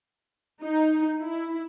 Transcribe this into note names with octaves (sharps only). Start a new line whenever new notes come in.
D#4
E4